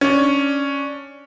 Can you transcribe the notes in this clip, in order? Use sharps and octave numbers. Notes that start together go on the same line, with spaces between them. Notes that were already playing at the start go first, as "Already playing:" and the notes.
C#4 D4